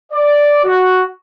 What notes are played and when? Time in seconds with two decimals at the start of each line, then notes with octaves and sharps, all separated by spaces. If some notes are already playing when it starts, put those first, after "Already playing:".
0.13 D5
0.65 F#4